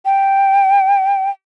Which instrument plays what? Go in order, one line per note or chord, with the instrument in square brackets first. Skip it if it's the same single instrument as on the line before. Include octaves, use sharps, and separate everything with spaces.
[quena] G5